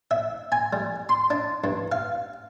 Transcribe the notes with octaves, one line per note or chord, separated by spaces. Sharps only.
E5
G#5
G3
C6
D4
G2
F5